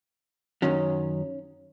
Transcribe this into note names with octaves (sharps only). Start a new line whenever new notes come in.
F#2 D#3 F#3 C#4